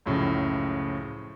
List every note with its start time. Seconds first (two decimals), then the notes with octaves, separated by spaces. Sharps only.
0.06 C#2 F#2 A2 C#3 F3